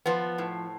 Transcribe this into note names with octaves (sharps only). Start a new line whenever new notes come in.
F3 B3
A2